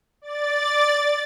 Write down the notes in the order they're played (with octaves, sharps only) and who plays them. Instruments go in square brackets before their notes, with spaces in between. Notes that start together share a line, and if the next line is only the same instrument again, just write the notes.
[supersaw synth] D5 A6